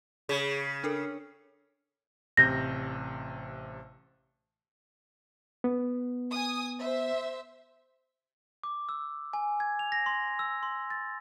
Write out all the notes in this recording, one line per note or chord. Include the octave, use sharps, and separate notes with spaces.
C#3 G#4 B5 G#6
D4 A4 A#4
A1 C3 G6 A#6
B3
G#5 D#6
C5 E5
D6
E6
G#5
G#6
F7
A#6
C6
E6
C6
A6